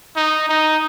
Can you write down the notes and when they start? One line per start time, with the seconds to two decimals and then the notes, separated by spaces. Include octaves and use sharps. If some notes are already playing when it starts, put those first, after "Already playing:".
0.16 D#4
0.49 D#4